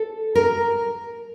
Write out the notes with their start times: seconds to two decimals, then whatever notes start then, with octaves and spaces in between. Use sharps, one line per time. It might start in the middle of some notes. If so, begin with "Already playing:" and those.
Already playing: A4
0.35 A#4